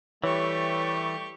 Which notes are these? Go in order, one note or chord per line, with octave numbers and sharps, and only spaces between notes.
E3 G3 A3 G4 C#5 C#6